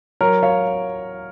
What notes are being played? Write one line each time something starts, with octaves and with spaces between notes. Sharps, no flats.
F#3 A#4 C#5
C#5 F5